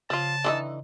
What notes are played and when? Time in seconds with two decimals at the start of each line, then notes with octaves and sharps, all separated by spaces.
0.10 C#3 F3 F4 A5
0.44 D3 E3 D#4